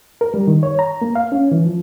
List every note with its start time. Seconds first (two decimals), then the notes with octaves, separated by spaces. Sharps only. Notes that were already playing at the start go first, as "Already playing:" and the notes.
0.21 A#4
0.34 G3
0.47 D#3
0.63 C#5
0.79 A#5
1.02 A#3
1.16 F5
1.32 C#4
1.52 E3
1.65 F3